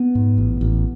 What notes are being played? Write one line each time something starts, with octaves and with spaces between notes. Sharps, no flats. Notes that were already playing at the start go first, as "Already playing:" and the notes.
Already playing: B3
G#2
A1
A1